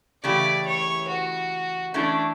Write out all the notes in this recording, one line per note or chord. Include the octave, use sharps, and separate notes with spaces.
C#3 E3 A3 E4 G4 D5
C#5
F#4
E3 A3 C#4 D4 E4 A4